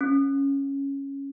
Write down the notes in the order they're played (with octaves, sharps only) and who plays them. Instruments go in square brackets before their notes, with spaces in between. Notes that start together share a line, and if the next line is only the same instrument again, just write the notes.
[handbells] C#4